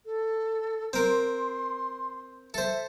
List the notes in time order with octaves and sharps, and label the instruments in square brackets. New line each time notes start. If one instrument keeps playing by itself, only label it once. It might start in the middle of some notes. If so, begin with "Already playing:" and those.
[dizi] A4
[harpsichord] C4 A#4 [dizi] C6
[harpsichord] A4 C5 [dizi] E5